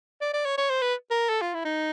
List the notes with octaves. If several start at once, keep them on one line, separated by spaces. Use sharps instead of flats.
D5
D5
C#5
C#5
C5
B4
A#4
A4
F4
E4
D#4